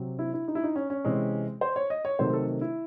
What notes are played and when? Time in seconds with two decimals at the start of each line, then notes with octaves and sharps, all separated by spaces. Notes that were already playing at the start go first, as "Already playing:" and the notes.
Already playing: C3 F#3 C4
0.19 E4
0.34 E4
0.48 D#4
0.55 E4
0.64 D#4
0.76 C#4
0.90 C#4
1.05 C3 E3 G#3 C4
1.61 C5
1.76 C#5
1.90 D#5
2.05 C#5
2.19 C3 D#3 F#3 A3 C4 C5
2.33 A4
2.61 E4